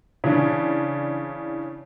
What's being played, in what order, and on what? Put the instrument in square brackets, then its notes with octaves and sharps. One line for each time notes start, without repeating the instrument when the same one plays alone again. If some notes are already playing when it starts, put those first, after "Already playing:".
[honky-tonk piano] C#3 E3 D4